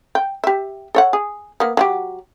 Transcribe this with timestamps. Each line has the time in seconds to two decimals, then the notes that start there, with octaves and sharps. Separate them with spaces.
0.15 G5
0.44 G4 E5
0.95 A4 C#5 F#5
1.13 G#4
1.60 A#3 B3
1.77 F#3 F#4 G4